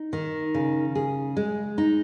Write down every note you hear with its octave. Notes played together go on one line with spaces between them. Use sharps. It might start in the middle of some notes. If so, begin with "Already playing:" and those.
Already playing: D#4
D#3
C#3
G#4
G#3
D#4